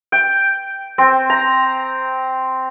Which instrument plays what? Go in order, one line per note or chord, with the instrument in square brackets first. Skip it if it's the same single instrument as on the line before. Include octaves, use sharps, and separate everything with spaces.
[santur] G5
C4
A#5